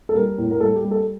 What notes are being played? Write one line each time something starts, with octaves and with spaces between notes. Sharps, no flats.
A4
G3 A#4
A2
A#4
G3 A4
G4
G3
A4